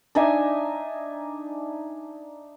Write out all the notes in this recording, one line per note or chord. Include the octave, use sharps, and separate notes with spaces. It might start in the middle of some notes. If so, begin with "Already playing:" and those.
D4 D#4 E5 G#5